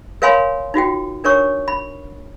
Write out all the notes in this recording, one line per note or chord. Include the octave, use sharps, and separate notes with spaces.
A#4 C#5 F5 G#5 B5 C6
D#4 F4 F#4 G5
D4 A#4 C#5 C#6
B5